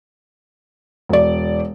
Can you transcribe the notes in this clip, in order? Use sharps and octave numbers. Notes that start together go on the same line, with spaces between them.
E1 D5